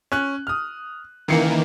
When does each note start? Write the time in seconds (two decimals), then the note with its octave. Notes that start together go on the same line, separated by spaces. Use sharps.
0.12 C#4 F#6
0.47 D#6 F6
1.28 C#2 D#3 E3 A#3 C7 C#7